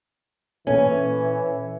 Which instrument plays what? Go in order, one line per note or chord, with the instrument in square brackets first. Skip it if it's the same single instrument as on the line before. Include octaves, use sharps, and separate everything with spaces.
[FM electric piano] A#2 A4 G#5 [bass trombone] E3 [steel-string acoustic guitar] C#4